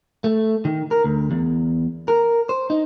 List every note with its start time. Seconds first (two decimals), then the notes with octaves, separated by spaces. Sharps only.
0.24 A3
0.65 D#3
0.91 A#4
1.04 D2
1.31 E2
2.08 A#4
2.49 C5
2.70 D#4